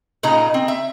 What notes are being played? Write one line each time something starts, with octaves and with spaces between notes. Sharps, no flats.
A#2 C#3 D#4 D#5 A#5
C4
E5